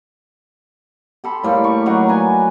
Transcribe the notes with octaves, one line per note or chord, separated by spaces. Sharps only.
G4 A4 B5 C6
A2 G3 A#3
C#6
F#3 D#4 F#4 F#5
B4 D5 G#5